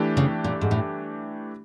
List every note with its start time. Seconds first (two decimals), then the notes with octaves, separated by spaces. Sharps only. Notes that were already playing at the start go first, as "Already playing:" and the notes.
Already playing: E3 A3 D4 G4
0.17 C#3
0.44 A#2
0.61 G#2
0.71 A2